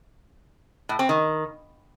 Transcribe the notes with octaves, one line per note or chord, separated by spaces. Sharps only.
A2
C4
D#3